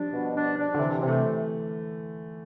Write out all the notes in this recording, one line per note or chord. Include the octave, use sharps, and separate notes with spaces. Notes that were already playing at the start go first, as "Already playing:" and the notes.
Already playing: F3 G3 D4
B2
D4
D4
D3
C3 E3
C3
A3